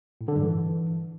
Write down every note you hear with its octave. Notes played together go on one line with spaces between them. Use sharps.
A2
D3
G2
E3